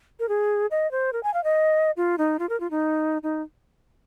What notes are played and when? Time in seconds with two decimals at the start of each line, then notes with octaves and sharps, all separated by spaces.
0.20 A#4
0.29 G#4
0.71 D#5
0.91 C5
1.13 A#4
1.23 G#5
1.34 F5
1.44 D#5
1.97 F4
2.18 D#4
2.39 F4
2.49 A#4
2.60 F4
2.71 D#4
3.23 D#4